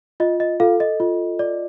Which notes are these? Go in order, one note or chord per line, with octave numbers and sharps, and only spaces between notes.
F4 D#5
D#5
F4 A4 F5
D#5
F4
D5